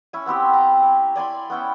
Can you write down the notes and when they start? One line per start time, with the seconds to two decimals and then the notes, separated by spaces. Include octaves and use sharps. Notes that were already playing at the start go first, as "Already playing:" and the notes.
0.13 C#4 E4 G#5
0.26 B3 C4 E4 G4
0.54 G5 A#5
0.83 C#6
1.15 D5 G#5 B5 C6
1.50 B3 C#4 E4 G5